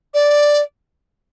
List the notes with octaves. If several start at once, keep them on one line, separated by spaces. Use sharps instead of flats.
D5